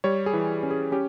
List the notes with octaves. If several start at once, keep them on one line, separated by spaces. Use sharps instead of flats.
G3 C#5
G#4
E3
C#4
G#4
C#4 G4